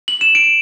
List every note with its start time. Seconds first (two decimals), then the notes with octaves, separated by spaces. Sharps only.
0.08 F#7
0.21 E7
0.35 D7